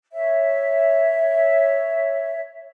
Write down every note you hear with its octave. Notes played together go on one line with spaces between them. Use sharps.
C#5 E5